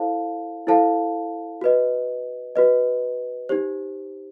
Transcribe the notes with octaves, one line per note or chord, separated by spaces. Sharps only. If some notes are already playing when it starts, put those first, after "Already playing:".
Already playing: E4 A4 C5 F5 A5
E4 A4 C5 F5 A5
F#4 B4 D#5
F#4 B4 D#5
D#4 G4 C5